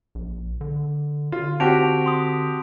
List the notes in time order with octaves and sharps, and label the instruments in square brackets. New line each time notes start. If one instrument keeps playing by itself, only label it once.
[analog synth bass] A#1
D3
[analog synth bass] D3 [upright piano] F4
[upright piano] C4 F#4 G4 [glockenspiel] A5 D7 F7
[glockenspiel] C6 D#6